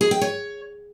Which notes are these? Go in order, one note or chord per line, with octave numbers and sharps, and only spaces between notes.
G#4
G5
C#5